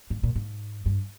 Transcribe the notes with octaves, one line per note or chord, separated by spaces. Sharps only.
G#2
A#2
G#2
G2